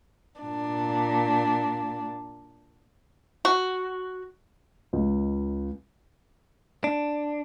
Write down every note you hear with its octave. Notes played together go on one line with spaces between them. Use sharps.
A#2 D4
F#4
C#2
D4